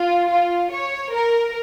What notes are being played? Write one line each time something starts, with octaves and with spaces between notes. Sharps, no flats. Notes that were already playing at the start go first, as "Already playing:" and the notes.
Already playing: F4
F4
C#5
A#4